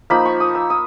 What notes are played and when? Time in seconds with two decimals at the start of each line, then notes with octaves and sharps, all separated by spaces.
0.10 F3 A#3 D#4 B5
0.25 C#6
0.40 D#6
0.55 E6
0.70 D#6